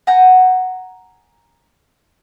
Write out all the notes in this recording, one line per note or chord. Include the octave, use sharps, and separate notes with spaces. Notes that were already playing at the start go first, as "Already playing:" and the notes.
F#5 G#5 A#5 G6